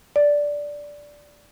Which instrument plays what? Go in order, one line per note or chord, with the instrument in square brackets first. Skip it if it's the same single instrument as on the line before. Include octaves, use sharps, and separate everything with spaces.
[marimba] D5